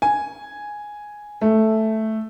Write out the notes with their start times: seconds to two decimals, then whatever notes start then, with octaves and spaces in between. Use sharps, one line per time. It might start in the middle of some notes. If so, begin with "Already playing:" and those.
0.02 G#5
1.42 A3